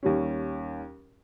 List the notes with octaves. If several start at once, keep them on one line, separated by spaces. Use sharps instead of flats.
D#2 D#3 G3 C#4